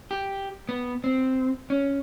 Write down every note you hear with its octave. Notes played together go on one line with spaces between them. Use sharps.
G4
B3
C4
C#4